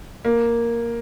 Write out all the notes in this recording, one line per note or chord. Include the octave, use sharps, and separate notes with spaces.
A#3